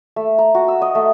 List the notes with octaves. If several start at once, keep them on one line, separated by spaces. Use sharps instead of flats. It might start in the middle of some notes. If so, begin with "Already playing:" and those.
A3
A#5
F#4
E6
D#5
A3